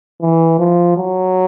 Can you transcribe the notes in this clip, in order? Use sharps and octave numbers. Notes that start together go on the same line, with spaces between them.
E3
F3
F#3